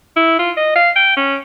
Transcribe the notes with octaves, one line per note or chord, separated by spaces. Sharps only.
E4
F4
D#5
F5
G5
C#4